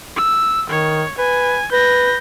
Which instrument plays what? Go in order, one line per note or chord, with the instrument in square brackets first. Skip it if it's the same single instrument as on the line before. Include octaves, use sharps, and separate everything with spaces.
[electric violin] E6
[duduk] D#3 [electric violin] C#5
[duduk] B4 [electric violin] G#5
[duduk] B4 [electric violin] G6 A#6